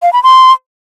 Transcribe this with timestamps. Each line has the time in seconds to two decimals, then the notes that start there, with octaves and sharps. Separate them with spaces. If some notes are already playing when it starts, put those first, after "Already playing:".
0.02 F5
0.13 B5
0.23 C6